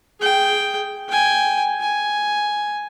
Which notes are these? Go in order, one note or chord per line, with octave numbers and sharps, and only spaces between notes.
G#4 G5
G5 G#5
G#5